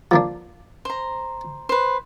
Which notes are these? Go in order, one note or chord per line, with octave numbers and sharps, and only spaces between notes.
F3 A#3 D4
C5 A#5
B4 C5